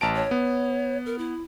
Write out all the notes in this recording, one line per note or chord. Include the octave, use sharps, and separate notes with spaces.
A1 A5 A#5 D7
C#5
B3
A#4
E4